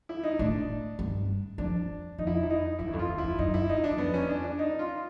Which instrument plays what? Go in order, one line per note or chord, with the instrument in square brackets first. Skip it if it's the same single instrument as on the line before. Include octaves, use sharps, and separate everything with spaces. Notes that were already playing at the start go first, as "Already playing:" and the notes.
[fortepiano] E4
D#4
[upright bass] A2 [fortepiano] D4
[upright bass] G2
[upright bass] F2 [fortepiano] D4
[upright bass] F2 [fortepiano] D#4
[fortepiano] E4
D#4
E4
D#4
[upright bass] F#2 [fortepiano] E4
[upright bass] E2
F2
[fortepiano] F4
[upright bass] E2
[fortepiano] E4
[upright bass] F2
[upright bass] F#2 [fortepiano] D#4
[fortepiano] E4
D#4
D4
[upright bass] F#2
[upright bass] F2 [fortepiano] B3
[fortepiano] C#4
D4
D4
D#4
F4